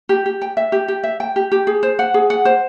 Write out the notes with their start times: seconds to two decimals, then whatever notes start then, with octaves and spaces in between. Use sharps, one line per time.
0.09 G4
0.26 G4
0.42 G5
0.57 E5
0.72 G4
0.88 G4
1.03 E5
1.20 G5
1.36 G4
1.52 G4
1.67 G#4
1.83 C5
1.99 F#5
2.14 G#4
2.30 F#5
2.45 C5